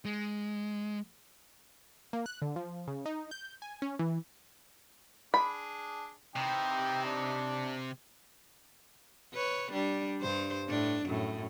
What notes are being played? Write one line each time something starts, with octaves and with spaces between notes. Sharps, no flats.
G#3
A#3
F#6
D3
F3
C#3
D#4
G6
G#5
C#4
E3
D4 G#4 B5
C3 E3 D#4 G5
D4
B4 C#5
G3 D4
G2 C5
A2 D4
F#2 A2